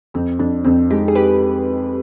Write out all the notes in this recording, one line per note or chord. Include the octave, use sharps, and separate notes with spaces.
F2 C4
F2 D4
F2 C4
G#3 D#4 G4
G#4
G4 B4